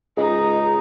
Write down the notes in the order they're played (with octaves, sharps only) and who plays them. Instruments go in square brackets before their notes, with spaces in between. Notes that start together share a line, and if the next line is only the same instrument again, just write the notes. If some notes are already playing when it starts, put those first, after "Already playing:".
[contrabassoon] C#2 [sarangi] D#4 [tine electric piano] G#4 D#5